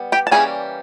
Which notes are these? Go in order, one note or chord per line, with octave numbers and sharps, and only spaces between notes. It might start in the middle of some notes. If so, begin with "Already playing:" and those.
Already playing: G3 B3
G4 G5
A5
E3 G3 A#3 C#4 G#4 G#5